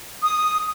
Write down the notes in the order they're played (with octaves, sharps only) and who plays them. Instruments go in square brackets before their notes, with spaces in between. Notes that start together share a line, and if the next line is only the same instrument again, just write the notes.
[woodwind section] D#6